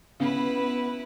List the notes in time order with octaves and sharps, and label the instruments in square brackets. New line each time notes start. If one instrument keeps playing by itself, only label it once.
[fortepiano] C#3 [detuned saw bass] B3 [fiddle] E4 B4